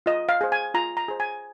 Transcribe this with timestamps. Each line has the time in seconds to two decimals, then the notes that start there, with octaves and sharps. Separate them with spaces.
0.06 F4 D#5
0.29 F5
0.41 G#4 C5
0.52 G#5
0.74 F4 A#5
0.97 A#5
1.08 G#4 C5
1.20 G#5